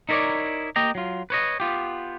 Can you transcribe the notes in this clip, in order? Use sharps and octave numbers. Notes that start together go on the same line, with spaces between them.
D#4 E4 A#4 C#5 D5
A#3 G4 D#5 G5 A#5
F#3 F4
B4 C#5 D#5
B3 F4 G4